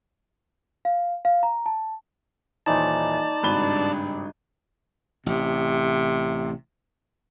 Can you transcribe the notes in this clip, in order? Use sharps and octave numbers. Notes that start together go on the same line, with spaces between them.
F5
F5
A#5
A5
D#1 E3 D#4 C5 D5 A5
G#1 G2 C#3 D4 B4 G7
A1 C3